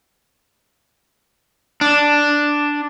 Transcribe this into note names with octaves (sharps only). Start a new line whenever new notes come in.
D4